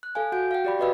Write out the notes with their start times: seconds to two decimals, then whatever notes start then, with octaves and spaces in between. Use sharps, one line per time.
0.03 F#6
0.15 A4 F5 G#5
0.32 F#4 F#5 G6 D7
0.51 F5 G5
0.65 G4 D5 B5
0.79 F#4 B4 D#5 F5 B5 E6